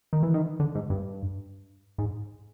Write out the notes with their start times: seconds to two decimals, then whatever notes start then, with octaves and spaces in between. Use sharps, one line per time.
0.13 D#3
0.23 E3
0.34 D#3
0.60 D3
0.75 G#2
0.90 G2
1.98 G#2